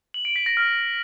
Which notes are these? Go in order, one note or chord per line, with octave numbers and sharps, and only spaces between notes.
F#7
D7
B6
A#6
F6